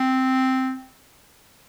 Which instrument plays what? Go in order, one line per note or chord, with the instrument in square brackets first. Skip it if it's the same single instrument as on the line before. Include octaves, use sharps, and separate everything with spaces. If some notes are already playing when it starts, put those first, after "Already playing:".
Already playing: [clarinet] C4